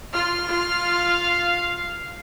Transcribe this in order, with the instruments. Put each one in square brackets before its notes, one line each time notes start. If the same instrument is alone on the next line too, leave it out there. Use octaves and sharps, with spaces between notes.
[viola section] F4 [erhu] F6
[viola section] F4 [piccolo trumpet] F5